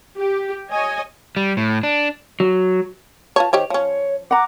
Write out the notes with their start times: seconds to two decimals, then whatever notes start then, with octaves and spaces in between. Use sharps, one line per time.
0.16 G4
0.70 C#5 D#5 G#5
1.37 G3
1.57 A2
1.83 D4
2.40 F#3
3.36 F4 B4 C#5 A5
3.53 D#3 G4 C5 C#5
3.70 F3 C#4 C#5
4.31 F#5 A#5 D6